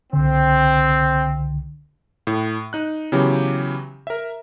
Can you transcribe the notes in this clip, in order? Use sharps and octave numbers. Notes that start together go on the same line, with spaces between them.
C2 D3 C4
A2
D#4 F#6
C#3 E3 F#3 B3 G4
A#4 E5